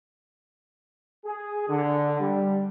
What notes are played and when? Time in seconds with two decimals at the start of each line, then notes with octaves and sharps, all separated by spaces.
1.25 G#4
1.68 D3
2.20 G3